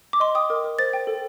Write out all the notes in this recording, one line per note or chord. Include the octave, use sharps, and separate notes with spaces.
D6
D#5 C6
G5 D#6
A#4
A#4
C5 A6
G5
A4